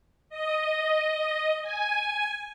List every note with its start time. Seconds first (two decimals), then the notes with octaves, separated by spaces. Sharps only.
0.29 D#5
1.62 G#5